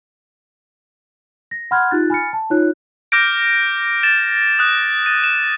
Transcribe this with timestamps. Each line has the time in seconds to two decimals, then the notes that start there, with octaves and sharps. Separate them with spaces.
1.51 A#6
1.71 F#5 B5 C6 F6 F#6 G#6
1.91 D#4 F4 G4 F#6 A6
2.10 G#5 B5 F6 A6 C#7
2.33 A5
2.50 D#4 F4 C#5 F#6
3.12 D6 F6 G6 A#6 D7
4.03 A6 E7
4.59 D#6 F#6
5.06 A6 D#7
5.24 E7